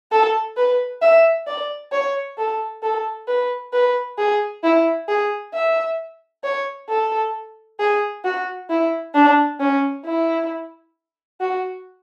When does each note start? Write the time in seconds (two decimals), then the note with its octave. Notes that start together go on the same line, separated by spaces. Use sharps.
0.12 A4
0.57 B4
1.02 E5
1.47 D5
1.92 C#5
2.38 A4
2.83 A4
3.28 B4
3.73 B4
4.18 G#4
4.64 E4
5.08 G#4
5.54 E5
6.43 C#5
6.89 A4
7.80 G#4
8.24 F#4
8.70 E4
9.14 D4
9.60 C#4
10.05 E4
11.41 F#4